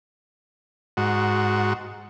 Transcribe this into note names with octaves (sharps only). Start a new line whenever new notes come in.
G#2 F#4